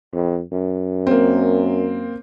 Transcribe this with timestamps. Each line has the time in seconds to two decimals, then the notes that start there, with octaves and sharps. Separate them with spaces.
0.13 F2
0.52 F#2
1.07 A#3 C4